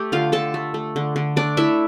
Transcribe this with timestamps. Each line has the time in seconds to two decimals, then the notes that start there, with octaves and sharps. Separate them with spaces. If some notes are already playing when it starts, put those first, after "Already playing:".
Already playing: A3 G4
0.12 D3 F4 F5
0.32 D3 A4 A5
0.54 A3
0.74 A3
0.96 D3
1.16 D3
1.36 A3 D4 D5
1.57 A3 E4 E5